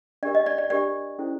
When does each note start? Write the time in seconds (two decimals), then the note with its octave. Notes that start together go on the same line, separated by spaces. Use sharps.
0.23 D4 G4 A#4 D5
0.35 D#5
0.46 D5
0.58 D5
0.70 D4 G4 A#4 D5
1.19 C#4 E4 A4 C5